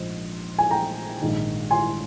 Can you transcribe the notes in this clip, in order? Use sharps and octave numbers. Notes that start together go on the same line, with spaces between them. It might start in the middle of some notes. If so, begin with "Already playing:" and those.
Already playing: A#1 G#2 F3 C5 D#5
G#5
G5 A#5
A#1 G#2 D#3
G#5 C6